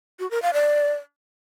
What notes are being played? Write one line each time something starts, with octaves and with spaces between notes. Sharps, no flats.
F#4
A#4
F5
D5